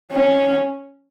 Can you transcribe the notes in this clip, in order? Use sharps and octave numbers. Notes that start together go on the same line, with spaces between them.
C#4